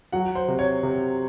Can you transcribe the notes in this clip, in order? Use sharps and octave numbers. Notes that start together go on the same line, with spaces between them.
F#3 F#5
C5
C3
C#5
C3